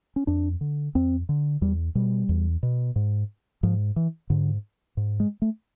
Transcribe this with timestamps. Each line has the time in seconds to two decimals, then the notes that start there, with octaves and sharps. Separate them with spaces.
0.16 C#4
0.27 F2 D4
0.61 D3
0.95 F2 C4
1.29 D3
1.61 E2 G3
1.95 B2 G3
2.29 E2
2.63 B2
2.96 G#2
3.63 G#2 F3
3.96 E3
4.30 G#2 D3
4.97 G#2
5.20 G#3
5.42 A3